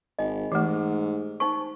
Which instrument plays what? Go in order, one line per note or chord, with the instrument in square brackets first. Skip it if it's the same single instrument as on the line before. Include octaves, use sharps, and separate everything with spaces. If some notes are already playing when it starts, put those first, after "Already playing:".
[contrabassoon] G#1 [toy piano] D#5
[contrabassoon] G#2 [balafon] E3 A3 [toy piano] G4
[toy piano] D#4 C5 C#6